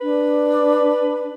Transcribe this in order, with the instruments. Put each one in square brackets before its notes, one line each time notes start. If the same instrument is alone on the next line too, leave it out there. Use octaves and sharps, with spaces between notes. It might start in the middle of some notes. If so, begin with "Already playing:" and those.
[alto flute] D4 [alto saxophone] B4